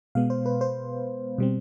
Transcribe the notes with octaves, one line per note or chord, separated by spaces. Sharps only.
B2 G#3 B3 F5
C5
B4
C5
B2 G3 C4